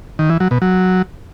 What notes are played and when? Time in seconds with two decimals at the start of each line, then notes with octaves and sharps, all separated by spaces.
0.19 D#3
0.30 E3
0.40 F#3
0.51 B2
0.62 F#3